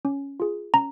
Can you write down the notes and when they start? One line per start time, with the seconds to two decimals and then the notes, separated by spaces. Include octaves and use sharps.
0.05 C#4
0.40 F4 G#4
0.74 C#4 A#5